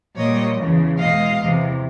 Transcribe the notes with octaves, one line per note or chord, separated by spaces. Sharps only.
A#2 G3 C#5 D#5
E2 C#3 E3
E2 B2 G#3 D#5 F5
E2 C3 E3